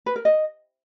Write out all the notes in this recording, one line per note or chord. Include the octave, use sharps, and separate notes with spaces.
B4
A#4
D#5